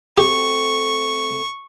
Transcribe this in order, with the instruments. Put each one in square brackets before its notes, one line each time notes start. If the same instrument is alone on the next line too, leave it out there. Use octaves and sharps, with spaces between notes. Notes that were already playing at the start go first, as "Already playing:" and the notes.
[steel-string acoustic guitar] A3 C4 F#4 [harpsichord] G4 [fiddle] C#6